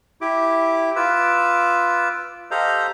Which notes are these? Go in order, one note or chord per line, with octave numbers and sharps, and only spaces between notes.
E4 G4 D6
F4 B4 D6 E6
G4 A4 C5 D#5 F5 A#5